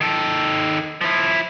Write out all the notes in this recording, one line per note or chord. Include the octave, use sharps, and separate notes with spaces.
D#3 A4
F3 E4